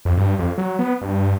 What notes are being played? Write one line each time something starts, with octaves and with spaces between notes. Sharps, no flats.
F2
G2
F2
F#3
B3
G2